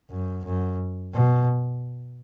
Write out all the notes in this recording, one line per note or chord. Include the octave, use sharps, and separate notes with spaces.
F#2
F#2
B2